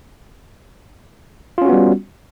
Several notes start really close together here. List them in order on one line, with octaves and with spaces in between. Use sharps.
F4 C#4 F#4 B3 G3